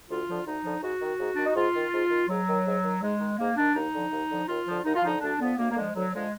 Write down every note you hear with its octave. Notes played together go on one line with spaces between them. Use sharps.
D2 F4
D3 F3
D2 D#4
D3 F3
G#2 F#4
D#3
G#2
D#3 D4
D#4
G#2 F4
D#3
G#2
D#3
G#2 F#3
D#3
G#2
D#3
G#2 G#3
D#3
G#2 A#3
D#3 D4
D#2 D#4
D3 F3
D#2
D3 F3
D#2 F4
D3 F3
D#2 D#4
F4
D3 F3 D#4
D2 D4
D3 F3 B3
D2 A#3
A#3
D3 F3 G#3
D2 F#3
D3 F3 G#3